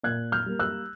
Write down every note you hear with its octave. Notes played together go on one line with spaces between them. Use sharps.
A#2 F#6 G#6
F6 G6
G3 A#3
E6 F#6